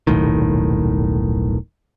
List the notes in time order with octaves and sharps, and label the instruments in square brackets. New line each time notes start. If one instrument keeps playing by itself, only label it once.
[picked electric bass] D#1 B1 A2 D#3